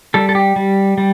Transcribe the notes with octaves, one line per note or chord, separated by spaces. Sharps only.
G3 A4
A4
G4
G3
G3